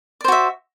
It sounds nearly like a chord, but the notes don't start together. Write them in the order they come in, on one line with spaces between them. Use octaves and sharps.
D5 C5 F#4 E5